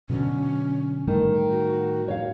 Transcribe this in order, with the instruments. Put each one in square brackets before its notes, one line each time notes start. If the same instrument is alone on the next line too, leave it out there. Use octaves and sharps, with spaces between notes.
[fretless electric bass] B2 D3 F#3 [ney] C#4
[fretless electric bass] A2 G3 A3 [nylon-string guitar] D#3
[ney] F#4
[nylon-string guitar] C#5 F5